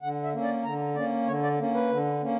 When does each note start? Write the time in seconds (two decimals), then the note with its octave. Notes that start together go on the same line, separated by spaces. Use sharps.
0.02 D3 F#5
0.23 E5
0.33 A#3 C#4
0.44 D5
0.64 D3 A#5
0.96 A#3 C#4 D5
1.27 D3 C#5
1.43 D5
1.59 A#3 C#4
1.74 B4
1.90 D3
2.22 A#3 C#4